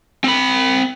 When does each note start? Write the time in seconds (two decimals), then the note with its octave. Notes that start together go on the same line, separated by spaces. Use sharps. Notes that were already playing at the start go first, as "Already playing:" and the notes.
0.24 C4 B5